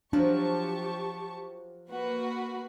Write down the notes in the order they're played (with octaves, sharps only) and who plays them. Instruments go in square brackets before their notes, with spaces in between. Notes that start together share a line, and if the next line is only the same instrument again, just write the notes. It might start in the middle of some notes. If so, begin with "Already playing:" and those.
[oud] F3 F#3 [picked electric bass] D4 [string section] G4 A5 C#6
[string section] A#3 F#4 B4